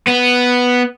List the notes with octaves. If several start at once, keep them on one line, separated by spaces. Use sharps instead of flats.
B3